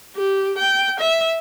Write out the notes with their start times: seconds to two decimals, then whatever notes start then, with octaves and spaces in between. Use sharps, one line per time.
0.16 G4
0.58 G5
1.00 E5